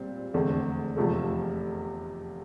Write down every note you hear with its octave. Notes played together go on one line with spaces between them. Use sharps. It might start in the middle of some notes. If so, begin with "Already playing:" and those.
Already playing: A#2 G3 C4
F1 E2 D3 A3 C4
F1 E2 C3 F3 A3